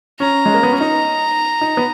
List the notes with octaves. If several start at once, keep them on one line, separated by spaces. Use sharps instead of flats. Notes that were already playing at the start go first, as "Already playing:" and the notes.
C#4 A#5
G#3
A#3
B3
C#4
D#4 A#5
D#4
B3